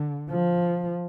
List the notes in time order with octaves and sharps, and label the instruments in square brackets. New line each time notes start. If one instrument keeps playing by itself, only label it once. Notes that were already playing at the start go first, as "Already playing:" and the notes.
Already playing: [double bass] D3
F3